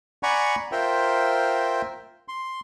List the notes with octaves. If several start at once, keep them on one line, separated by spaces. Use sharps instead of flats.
D5 F#5 G#5 A#5 B5 C#6
F4 A#4 C5 E5 G5
C6